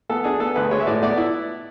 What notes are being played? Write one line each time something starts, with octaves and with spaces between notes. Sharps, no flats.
B3 A4
D4 G#4
B3 A4
D2 B4
G#3 C#5
E5
A2 D5
B3 D5
E4